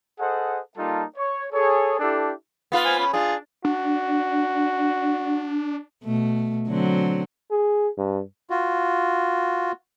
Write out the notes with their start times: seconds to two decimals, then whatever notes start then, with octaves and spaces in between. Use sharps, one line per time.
0.19 G#4 A4 C5 D#5 F#5
0.77 G3 A#3 D#4 F4 A4 A5
1.17 C#5
1.52 G#4 A4 C#5
1.99 D4 E4 G4 A4
2.72 B3 F4 B4
2.85 C5 G#5 F6
2.98 C#4 B5
3.14 D4 F4 G#4
3.65 D4 F#4
6.04 B2 A3
6.68 D3 F#3 C4
7.51 G#4
7.98 G2
8.50 F4 F#4